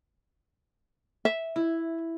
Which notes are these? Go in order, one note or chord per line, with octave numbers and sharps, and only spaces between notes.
E5
E4